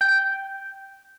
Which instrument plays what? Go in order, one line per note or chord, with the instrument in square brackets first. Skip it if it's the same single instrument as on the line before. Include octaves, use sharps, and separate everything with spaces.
[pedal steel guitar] G5